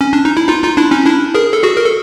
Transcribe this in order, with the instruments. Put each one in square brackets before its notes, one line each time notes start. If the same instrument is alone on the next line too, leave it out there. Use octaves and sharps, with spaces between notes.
[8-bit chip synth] C#4
D4
D#4
E4
D#4 F4
D#4 F4
D4 E4
C#4 D#4
D4 E4
G#4 A#4
A4
F#4 G#4
A#4
A4